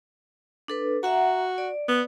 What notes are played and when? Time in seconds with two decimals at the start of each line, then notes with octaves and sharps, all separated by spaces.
0.68 D4 A4 B4
1.03 F#4 E5 F#5 A#5
1.58 D5
1.88 B3